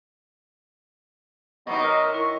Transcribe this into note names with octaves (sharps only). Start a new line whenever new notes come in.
C3 F#3 B3 D#4 D#5 C#6 D#6
A#4 D#5
E4 A#4 C#6